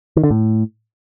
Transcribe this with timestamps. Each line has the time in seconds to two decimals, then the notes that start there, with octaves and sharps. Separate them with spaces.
0.17 D#3
0.24 D3
0.31 A2